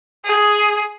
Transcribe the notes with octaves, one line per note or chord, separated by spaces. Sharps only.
G#4